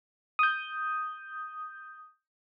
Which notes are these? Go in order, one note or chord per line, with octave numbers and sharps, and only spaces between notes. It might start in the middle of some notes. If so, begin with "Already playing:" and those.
D#6 G6